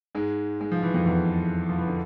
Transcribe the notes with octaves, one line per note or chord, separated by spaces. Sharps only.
G#2 G#3
G#3
F3
E3
F2 F3
E2 E3
F3
E3
D3